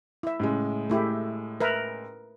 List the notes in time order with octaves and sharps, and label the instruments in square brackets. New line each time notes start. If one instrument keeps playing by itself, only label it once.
[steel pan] E4 E5
[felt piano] A2 C#3 G#3
[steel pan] A3 E4 G4
A#4 B4 E5